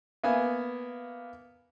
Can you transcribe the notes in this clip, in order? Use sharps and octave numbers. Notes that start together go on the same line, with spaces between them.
A#3 B3 E5 G#5